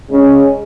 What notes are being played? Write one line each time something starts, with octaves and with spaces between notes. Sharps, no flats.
C#3 G#3 C#4